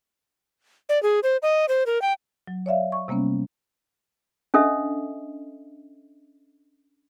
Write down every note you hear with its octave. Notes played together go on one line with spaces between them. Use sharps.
D5
G#4
C5
D#5
C5
A#4
G5
F#3
C#5 D5 E5 F5
C#6
C3 G3 A#3 B3 C#4
C#4 D4 A4 D#5 E5